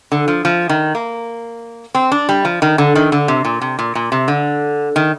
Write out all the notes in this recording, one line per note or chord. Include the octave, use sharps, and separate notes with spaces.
D3
F3
F3
D#3
A#3
C4
D4
G3
F3
D#3
D3
D#3
D3
C3
A#2
C3
A#2
A#2
C3
D3
D#3